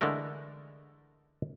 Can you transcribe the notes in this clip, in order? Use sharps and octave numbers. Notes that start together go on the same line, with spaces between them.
D3 E3 G#3 A3 A#4